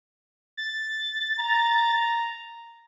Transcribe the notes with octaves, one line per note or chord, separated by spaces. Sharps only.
A6
A#5